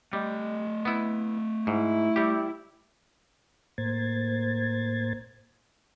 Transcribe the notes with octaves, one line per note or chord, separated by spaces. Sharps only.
G3 A3 D#5
B3 E4
G#2 E4
G3 G4
A2 A#3 C5 G#6 A6